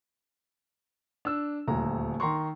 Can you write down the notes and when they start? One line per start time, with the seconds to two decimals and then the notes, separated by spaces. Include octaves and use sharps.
1.25 D4 E6
1.68 D#1 D2 A#5
2.20 D#3 A#5 C6 C#6